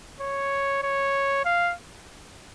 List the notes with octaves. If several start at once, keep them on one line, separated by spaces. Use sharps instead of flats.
C#5
C#5
F5